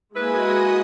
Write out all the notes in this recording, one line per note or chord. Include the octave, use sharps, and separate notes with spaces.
G#3 A#3 E4 F#4 B4 D#5 G#5 D#6